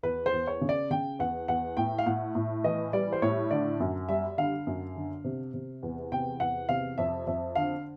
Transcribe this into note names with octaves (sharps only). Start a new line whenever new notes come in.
E2 B4
C5
E2
C#5
C#3
D5
C#3 G5
E2 F#5
E2 F#5
A2 G5
F5
A2 F#5
A2
E3 D#5
G3 D5
C5
A2 C#5
D3 D5
F#2
G3 E5
D3 F5
F#2
D3
C3
C3
E2
C3 G5
E2 F#5
C3 F5
F2 E5
F2 E5
D3 F5